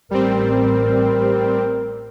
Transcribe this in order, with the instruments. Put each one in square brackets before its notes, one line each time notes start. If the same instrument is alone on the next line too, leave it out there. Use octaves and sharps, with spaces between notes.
[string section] A1 [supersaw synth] G3 C4 [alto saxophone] A#4